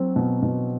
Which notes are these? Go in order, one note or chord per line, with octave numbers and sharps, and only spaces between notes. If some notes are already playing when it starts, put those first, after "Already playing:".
Already playing: F#3 C4
B2
B2